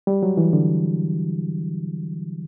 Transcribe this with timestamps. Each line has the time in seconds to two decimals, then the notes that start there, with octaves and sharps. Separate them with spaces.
0.07 G3
0.23 F#3
0.37 E3
0.53 D3